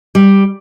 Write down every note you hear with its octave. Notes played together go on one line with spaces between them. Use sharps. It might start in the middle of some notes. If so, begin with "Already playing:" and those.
G3